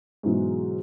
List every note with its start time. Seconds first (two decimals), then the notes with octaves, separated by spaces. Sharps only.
0.23 G#2 B2 E3 F#3 G#3